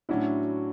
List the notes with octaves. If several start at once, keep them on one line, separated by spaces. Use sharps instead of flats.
A2 F#3 C#4 D4 E4 F#4